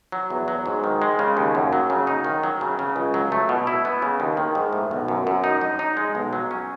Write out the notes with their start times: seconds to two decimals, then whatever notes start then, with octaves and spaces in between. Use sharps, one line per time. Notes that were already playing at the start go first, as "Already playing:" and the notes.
0.12 F#3
0.30 E2
0.48 F#3
0.66 G#2
0.84 D#3
1.02 G#3
1.19 C#3
1.37 D#2
1.55 F#2
1.73 F#3
1.90 C#3
2.07 D#4
2.25 D#3
2.43 F#3
2.61 C#3
2.79 C#3
2.96 C#2
3.14 F#3
3.32 A3
3.49 B2
3.67 E4
3.85 B3
4.02 C#3
4.20 D#2
4.37 D#3
4.55 G#2
4.73 A2
4.91 B1
5.08 F#2
5.27 F#2
5.44 D#4
5.61 D#4
5.79 D#4
5.97 G#3
6.15 B1
6.33 F#3
6.51 C#4